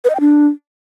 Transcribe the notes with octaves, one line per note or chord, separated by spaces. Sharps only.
B4
D#5
G5
D4